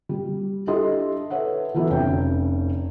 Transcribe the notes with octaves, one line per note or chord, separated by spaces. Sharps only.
G3
D4 E4 G4 A4 D#5 C6
A4 B4 C#5 E5 F#5
E3 F#3 B3 E4 A4
F1 C#4 C#5 G5